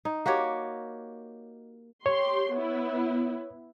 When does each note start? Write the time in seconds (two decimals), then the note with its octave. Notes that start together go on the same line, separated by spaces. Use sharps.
0.05 D#4
0.26 A#3 F#4 G4 C#5
2.06 G4 C#5 C6
2.53 B3 E4